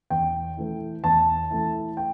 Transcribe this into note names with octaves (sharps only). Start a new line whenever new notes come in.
E2 G5
E3 A3 E4
E2 A5
E3 A3 E4
G5